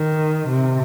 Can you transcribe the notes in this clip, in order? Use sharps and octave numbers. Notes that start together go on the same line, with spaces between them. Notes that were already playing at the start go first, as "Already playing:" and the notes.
Already playing: D#3
C3